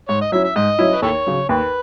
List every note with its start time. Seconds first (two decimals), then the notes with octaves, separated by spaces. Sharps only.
0.08 G#2 C#5
0.21 D#5
0.32 F#3 C#4 E4 E5
0.44 E5
0.56 G#2 D#5
0.79 F#3 C#4 E4
0.93 B4
1.02 D#2 E4 A4 C#5
1.27 C#3 F#3
1.49 D#2 B4